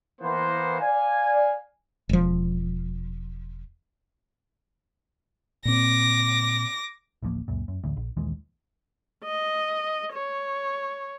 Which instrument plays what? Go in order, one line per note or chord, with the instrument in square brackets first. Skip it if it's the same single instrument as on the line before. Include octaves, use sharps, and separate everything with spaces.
[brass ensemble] E3 A#3 B3 C5
D5 F5 G#5
[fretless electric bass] E1 F3
[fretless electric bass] A#2 C4 [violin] D6 A#6
[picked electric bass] D1 A1 F3 A#3
C#2 F#2 A#2
F#2
A1 D2
A#1
A#1 D#2 E3 G#3
[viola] D#5
C#5